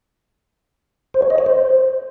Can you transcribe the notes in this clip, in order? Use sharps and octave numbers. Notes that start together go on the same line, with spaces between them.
C5
C#5
D#5
C#5
C5